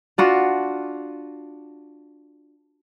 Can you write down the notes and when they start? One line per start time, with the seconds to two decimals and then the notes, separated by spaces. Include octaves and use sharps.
0.18 D4 F4 F#4